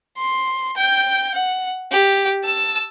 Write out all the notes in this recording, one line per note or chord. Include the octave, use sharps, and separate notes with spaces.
C6
G5 G6
F#5
G4
A5 E6